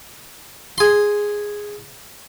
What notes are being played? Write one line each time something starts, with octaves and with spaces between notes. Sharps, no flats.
G#4 C6